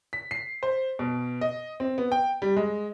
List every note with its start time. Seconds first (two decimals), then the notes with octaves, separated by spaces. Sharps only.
0.13 B6
0.31 C7
0.63 C5
0.99 B2
1.41 D#5
1.80 C4
1.98 B3
2.12 G5
2.42 G3
2.56 G#3